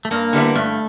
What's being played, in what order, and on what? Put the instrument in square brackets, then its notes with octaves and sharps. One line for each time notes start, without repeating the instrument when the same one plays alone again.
[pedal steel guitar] A3
[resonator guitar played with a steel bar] G2 [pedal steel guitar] A#3
[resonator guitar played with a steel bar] D3 G3 B3 E4
[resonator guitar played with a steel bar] G2 [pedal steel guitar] A3